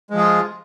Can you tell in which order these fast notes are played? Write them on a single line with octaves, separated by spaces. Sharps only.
G#3 F3 G#4 F4